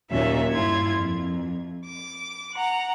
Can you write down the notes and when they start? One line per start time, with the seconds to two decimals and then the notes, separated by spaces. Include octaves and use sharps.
0.11 D#2 A#2 F#3 C#4 E5
0.51 G2 E4 F4 G#6
0.97 F2
1.85 D6
2.54 F#5 A#5